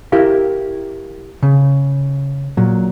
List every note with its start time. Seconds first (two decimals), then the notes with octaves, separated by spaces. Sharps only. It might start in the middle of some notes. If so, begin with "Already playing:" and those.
0.12 E4 G4 A#4 F5
1.43 C#3
2.57 A#2 F#3